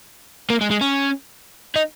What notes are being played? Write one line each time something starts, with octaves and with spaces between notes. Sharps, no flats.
A#3
G#3
G#3
C#4
D#4